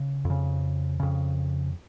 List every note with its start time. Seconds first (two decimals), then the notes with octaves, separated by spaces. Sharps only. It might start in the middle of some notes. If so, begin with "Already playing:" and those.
Already playing: C#3
0.25 F2
0.30 C#3
1.00 F2 C#3